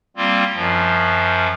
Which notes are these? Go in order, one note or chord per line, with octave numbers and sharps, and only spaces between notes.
G3 A#3 C4 F4
F#2 F3